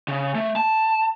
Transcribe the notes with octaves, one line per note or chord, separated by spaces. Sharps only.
C#3
A3
A5